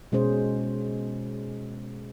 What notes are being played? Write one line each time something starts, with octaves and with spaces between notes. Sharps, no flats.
B2 G#3 C#4 G#4 C5